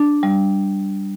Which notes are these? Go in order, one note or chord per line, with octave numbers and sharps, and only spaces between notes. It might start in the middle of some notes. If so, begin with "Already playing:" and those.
Already playing: D4
G3